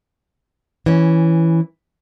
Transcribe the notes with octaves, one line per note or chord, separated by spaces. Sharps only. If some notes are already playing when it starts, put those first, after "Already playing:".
E3 C#4